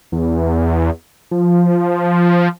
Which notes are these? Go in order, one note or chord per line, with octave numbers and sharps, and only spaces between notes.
E2
F3